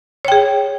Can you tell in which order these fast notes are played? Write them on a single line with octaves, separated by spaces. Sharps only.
C#5 G5 G#4